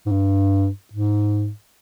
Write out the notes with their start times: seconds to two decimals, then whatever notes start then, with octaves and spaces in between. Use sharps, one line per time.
0.06 G#2
0.12 G2
0.93 G#2